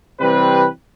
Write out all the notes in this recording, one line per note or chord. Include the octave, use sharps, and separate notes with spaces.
C3 E3 G3 C4 G4 B4